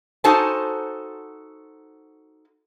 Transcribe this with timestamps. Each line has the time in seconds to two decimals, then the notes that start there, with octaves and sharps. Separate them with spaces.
0.24 D#4 F#4 A4 C5 G#5 A5